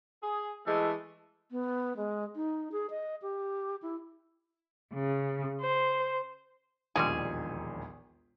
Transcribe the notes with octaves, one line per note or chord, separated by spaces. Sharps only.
G#4
E3 G#3 A3 A4
B3
G#3
D#4
G#4
D#5
G4
E4
C#3
C5
E1 A#1 D#2 G3 G#3 G#4